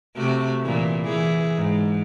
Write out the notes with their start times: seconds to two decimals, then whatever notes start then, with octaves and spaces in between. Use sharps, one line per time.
0.16 C3 A3 F#4
0.62 A#2 E3
1.04 E3 G#4
1.56 G#2